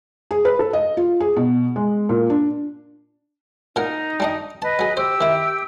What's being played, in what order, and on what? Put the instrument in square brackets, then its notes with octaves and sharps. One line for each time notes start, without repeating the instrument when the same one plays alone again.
[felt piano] G#4
B4
A4
D#5
F4
G#4
B2
G#3
A#2
D4
[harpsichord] A#2 A#4 F#5 [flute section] D#4
[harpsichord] G3 D4 D#5
[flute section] B4 D#5 [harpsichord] A5
[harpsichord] F#3 G#4
[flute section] G4 E6 [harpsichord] C5
[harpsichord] D#3 E4